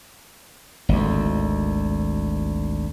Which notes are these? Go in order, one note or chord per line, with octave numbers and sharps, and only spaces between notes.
G#1 D2